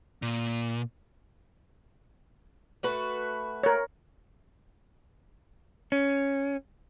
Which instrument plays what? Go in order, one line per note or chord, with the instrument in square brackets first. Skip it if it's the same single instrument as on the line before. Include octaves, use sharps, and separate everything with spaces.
[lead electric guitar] A#2
[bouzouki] A3 F#4 B4
[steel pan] A#4 C#5
[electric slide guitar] C#4